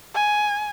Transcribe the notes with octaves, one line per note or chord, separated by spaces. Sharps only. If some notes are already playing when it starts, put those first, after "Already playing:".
G#5